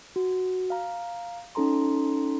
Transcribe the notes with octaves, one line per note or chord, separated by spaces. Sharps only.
F#4
F5 A#5
C#4 D#4 A4 A#5 C6